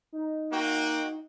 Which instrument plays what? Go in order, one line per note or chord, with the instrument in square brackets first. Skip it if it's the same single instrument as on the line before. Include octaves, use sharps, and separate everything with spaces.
[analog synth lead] D#4
[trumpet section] A#3 F#4 G5